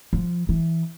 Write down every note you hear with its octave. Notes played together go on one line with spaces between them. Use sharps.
F3
E3